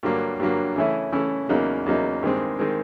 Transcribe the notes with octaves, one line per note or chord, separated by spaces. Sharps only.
G2 D3 F#3 A#3
G2 D3 F#3 A#3
C#3 E3 A3 C#4 E4
C#3 E3 A3 C#4 E4
E2 C#3 F#3 A#3 D#4
E2 C#3 F#3 A#3 D#4
G2 D#3 G#3 C4
D#3 G#3 C4